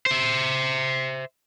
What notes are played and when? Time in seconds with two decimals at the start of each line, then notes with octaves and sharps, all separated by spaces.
0.06 C5 E5